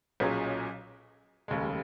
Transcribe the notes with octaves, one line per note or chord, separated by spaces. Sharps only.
B1 A#2 F#3 C#4 G#4
F1 D#2 C#3 G#3